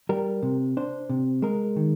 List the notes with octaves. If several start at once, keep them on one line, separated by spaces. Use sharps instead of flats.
G3 A#4
C3
D4 C5
C3
G#3 A#4
D#3